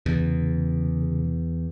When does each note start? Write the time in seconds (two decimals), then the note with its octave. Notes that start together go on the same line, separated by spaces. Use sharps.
0.06 E2 C#3